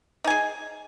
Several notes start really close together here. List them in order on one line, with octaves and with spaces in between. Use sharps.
D#4 G#5 G#4